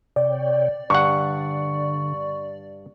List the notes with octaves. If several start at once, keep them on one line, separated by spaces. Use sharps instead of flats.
C3 C#5 D5 G5
G2 D3 F#5 C#6